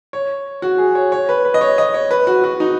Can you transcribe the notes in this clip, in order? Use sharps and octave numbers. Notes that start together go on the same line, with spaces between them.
C#5
F#4
G#4
C#5
C#5
B4
B4
D#5
C#5
D#5
C#5
B4
F#4
F#4
D#4